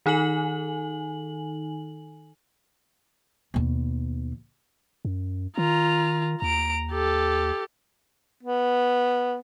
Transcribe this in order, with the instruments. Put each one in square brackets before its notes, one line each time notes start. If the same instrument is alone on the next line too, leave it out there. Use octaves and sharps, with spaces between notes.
[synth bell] D#3 D#4 A4 G#5 F#7
[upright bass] D#2 B2
[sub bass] F#2
[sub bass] D#3 [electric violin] F4 A#5
[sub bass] D#2 [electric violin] A#5 D7
[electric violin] G4 A4
[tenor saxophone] B3